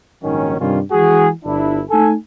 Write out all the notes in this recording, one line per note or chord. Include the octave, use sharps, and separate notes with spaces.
A#1 G#2 D#3 F#3 C#4
G2 C3 D#3 G3 C#4 F4
E3 G#3 F#4 G#4
G1 D4 E4
A3 D#4 A4 G#5